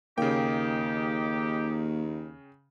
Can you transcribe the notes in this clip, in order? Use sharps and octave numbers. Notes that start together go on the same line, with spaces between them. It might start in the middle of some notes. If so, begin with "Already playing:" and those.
D#2 C#3 A#3 D#4 G4 G5